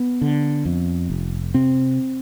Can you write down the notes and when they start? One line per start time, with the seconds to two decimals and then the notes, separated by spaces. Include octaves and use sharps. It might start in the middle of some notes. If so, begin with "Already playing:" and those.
Already playing: B3
0.21 D3
0.65 F2
1.10 F1
1.54 C3 C4